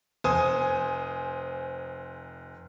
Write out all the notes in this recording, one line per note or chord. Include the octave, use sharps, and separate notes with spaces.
F1 C5 G#5 D#6